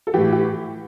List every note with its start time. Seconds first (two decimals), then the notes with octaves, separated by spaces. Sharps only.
0.07 A4
0.14 A2 E3 G4
0.32 G4